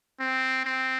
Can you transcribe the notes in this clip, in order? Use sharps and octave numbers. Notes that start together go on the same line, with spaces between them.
C4
C4